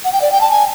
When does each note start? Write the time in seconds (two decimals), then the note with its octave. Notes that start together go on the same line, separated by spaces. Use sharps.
0.04 F#5
0.13 G5
0.22 D5
0.32 G5
0.41 A5
0.51 G#5